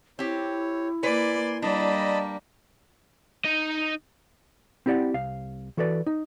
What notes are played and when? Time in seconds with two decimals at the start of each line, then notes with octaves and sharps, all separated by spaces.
0.19 C4 E4 G4 C#5
1.03 A#3 B4 D5 G#5 C6
1.62 G3 A#3 D4 D#5 A5 B5
3.45 D#4 D#5
4.86 C4 E4 G4 D5 F#5
5.14 C2 F5
5.77 E3 F#4 A4 B4 D5
6.06 D#4